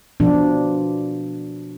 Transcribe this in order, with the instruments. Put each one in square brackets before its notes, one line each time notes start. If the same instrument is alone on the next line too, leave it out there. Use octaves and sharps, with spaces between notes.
[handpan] B2 F3 D4